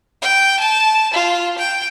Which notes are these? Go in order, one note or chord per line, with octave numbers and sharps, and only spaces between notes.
G5
A5
F4
G5